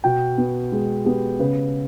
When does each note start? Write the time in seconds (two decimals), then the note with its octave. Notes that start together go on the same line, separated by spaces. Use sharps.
0.04 B2 G5
0.38 B3
0.72 G#3 G#4
1.05 B3 G4
1.39 C#3 B4